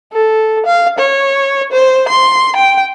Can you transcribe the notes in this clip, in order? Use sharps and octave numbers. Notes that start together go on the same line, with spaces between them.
A4
F5
C#5
C5
C6
G5